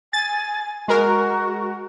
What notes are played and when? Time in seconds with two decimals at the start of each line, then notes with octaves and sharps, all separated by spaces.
0.13 G#5 A6
0.88 G#3 F#4 A#4